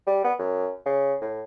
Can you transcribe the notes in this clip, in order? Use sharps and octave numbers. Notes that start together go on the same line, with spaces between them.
G3
B3
F#2
C#3
A2